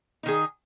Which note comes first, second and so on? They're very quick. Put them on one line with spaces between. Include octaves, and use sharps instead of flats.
D#4 D#3 G#4